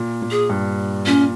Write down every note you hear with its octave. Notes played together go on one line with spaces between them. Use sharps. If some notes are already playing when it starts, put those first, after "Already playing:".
Already playing: A#2
A#2
G#4
G2
A#2 C#4